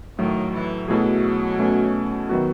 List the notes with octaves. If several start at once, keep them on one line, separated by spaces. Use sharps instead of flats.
A2 D#3 F#3 A3
E3
B2 F#3 A3 E4 G#4
B2 A3 C#4
D#3 F#3 B3 F#4